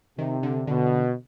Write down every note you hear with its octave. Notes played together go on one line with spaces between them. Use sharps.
C3 D#3
D3
B2 D3